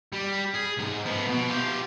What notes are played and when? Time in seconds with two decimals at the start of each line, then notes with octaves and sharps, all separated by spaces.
0.13 G3
0.54 G#4
0.78 C#2 G#2
1.05 F3 B3
1.28 B2
1.49 F4 G4